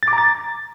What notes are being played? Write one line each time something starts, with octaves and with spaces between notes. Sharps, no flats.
A6
D6
A#5
A6